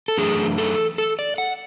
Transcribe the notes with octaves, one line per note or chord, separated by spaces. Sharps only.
A4
F#2 E3 A3 D4 G#4
A4
A4
D5
F#5